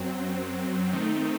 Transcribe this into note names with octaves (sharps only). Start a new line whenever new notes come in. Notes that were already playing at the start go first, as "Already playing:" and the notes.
Already playing: F#2 F#3 C4
D#3 A3 C4 D#4